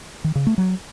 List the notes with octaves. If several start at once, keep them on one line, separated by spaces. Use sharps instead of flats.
D#3
C#3
A3
F#3